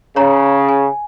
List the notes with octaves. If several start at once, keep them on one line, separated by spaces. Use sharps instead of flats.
C#3 C#5 A#5
G#5